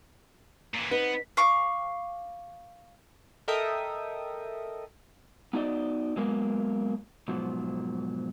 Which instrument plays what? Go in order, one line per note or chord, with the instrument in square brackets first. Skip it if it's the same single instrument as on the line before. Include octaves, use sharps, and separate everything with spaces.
[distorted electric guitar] A#2 E3
[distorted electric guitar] B3 [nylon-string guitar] C4 D#4 B4
[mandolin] F5 C#6 D6
[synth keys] A4 A#4 D#5 E5 G5 D#6
[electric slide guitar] B3 D#4 F#4 D5 D#5
F#3 G#3 A#3 B3
G#2 B2 F3 F#3